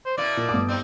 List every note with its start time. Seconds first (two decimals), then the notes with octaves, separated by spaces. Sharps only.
0.06 C5
0.18 B2 A#3 E4 D5
0.37 A#2
0.49 G1 D6
0.69 G3 C4 D#4